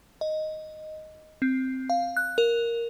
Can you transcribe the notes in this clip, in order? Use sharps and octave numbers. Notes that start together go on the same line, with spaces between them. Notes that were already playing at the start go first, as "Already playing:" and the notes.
D#5
C4
F5
F#6
A#4